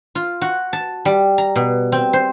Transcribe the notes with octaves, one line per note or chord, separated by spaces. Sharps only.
F4
F#4
A5
G3
A#5
B2
C4
C5